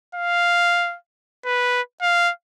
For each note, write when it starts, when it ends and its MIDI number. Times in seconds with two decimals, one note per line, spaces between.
0.15 0.96 77
1.45 1.81 71
2.01 2.31 77